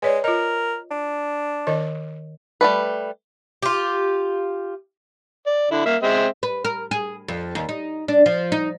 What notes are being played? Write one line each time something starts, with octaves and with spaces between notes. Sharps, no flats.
G#3 B4 C#5 D5
F4 A#4 D#5
D4
D#3 A#4 D#5
G3 A3 B4
F4 G4
D5
D3 E4
A#3 E5
G#3 C4 E5
B4
A#4
G#4
F2
D#2
D#4
D4
F3
D#4